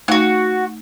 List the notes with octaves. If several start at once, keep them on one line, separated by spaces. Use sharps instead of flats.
A3 D#4 F#4 F5 F#5